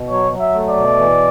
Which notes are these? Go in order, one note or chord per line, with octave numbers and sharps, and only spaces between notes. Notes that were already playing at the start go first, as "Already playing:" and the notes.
Already playing: B2
F#3 C#5
F#3
E5
A3
D5
B2
E3